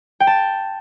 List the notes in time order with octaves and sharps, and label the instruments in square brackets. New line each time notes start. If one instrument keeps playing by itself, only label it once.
[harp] G5
A5